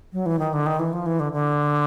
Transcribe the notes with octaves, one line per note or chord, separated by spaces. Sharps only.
F#3
E3
D#3
D3
D#3
E3
F3
E3
D3
D3